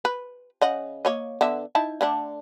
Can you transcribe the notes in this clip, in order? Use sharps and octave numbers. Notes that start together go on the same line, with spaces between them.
B4
C#3 D#5 F#5
A#3 C#5 D#5
D3 B3 E5
D#4 E4 A5
D3 A3 D4